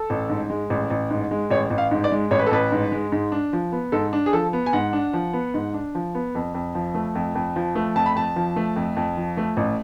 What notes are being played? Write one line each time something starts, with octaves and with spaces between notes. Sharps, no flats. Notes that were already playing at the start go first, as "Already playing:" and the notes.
Already playing: A4
A1
G#2
G#3
A1
A1
G#2
G#3
A1 C#5
A1
F5
G#2
D5
G#3
A1 C#5
B4
A4
A1 B4
G#2
G#3
G#2
D4
F3
B3
G#2 A4
D4
G#4
F3 A4
B3
G#5
G#2 F#5
D4
F3
B3
G#2
D4
F3
B3
F2
F2
F3
A3
F2
F2
F3
A3
F2 A5
B5
F2 A5
F3
A3
F2
F2
F3
A3
A1